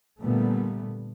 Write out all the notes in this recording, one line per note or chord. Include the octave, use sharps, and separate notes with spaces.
A#2 D3 G3 A3 B3